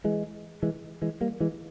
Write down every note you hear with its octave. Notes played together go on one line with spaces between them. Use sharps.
E3 G#3
E3 G#3
E3 G#3
G3 A#3
E3 G#3